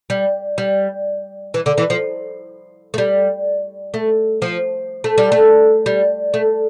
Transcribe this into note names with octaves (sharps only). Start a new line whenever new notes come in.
G3
G3
E3
D3
E3
F3
A3
G3
A3
F3
A3
G3
A3
G3
A3